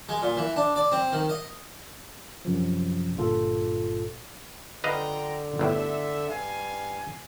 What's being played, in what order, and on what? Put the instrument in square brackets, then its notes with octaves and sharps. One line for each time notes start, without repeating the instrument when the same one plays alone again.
[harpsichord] G#3
A#2
E3
D4
D5
C4
D#3
D#5
[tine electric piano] F#2 C3 F3
G1 G2 A#2 F4 A4
[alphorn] D3 [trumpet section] F4 G5 A#5 [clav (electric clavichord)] B4 D#5 F5
[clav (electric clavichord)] G1 A2 [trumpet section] A4 E5
[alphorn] G2 [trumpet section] F5 G#5